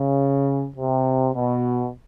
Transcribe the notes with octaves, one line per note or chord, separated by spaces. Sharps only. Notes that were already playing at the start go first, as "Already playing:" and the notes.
Already playing: C#3
C3
B2